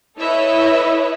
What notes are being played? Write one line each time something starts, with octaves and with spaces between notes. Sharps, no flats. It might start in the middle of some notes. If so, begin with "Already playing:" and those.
E4 A4 B4 C#5 D#5 E5